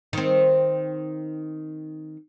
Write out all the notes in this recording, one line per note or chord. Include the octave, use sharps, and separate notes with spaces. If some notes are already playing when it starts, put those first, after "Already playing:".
D#3 C4